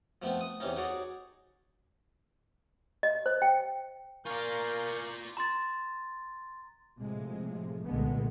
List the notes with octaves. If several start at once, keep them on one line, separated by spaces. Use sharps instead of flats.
F3 A3 B3 C4
D#6
E2 C3 E3 C#4 D#4
D#4 F#4 G#4 C#5 D5
D#5
C5
G5
F4 A#4 D5 F5 G#5 A#5 C#6 G6
A#5 C6 A6
A2 C3 F3 G#3
C2 A#2 D3 G#3 A3 B3